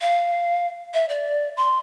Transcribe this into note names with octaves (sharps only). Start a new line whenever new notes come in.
F5
E5
D5
C6